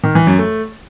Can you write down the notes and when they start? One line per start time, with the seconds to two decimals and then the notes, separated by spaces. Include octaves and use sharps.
0.04 D#3
0.15 E3
0.27 F#2
0.39 A3